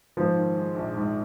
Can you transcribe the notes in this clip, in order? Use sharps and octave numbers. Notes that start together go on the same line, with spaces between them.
G#2 F3
D#3
G#3
A#1
G#2